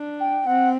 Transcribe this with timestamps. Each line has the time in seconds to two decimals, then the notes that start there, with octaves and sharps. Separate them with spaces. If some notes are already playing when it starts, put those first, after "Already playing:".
Already playing: D4
0.20 G5
0.47 C4 F#5